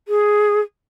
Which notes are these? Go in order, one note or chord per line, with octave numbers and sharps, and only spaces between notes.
G#4